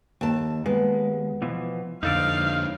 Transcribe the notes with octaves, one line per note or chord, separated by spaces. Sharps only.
D#2 A5
D#2 G#3 B3
B2 E3 F3
F2 D3 D#4 A4 D5 F5